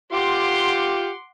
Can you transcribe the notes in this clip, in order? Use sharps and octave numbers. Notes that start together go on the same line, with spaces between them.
F4 G4 F#5 C6 D6